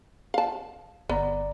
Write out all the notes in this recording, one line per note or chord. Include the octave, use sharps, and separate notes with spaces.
F5 A5
G1 B3 D5 A#5